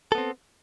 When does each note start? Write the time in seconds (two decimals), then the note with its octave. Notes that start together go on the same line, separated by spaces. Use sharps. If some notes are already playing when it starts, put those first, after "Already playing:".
0.12 A4
0.15 B3
0.18 C4